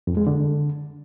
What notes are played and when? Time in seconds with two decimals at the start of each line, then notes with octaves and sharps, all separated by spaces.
0.07 F2
0.17 G#3
0.27 D3